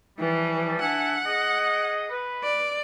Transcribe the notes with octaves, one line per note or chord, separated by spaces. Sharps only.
E3 F3 G3
D4 E5 F#5 G#5
G#4 D#5
B4
D5